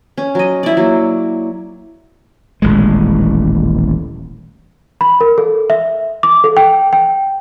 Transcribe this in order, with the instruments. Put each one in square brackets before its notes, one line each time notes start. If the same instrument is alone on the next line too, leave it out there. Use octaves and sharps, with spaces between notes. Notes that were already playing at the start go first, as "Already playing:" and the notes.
[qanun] C#4
F#3 D#5
E4 D5
F#3 A#3
[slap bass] D#1 A1 G#3
[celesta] B5
A#4
A4
E5
D6
A4
G5
G5